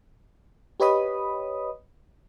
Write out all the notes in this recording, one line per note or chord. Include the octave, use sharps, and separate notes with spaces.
G4 B4 C#5 D#5 B5 D#6